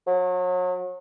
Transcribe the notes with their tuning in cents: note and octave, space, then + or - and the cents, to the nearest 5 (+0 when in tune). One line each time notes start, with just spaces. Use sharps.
F#3 -35